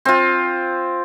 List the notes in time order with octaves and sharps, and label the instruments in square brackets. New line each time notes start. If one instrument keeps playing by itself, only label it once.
[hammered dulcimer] C4 F4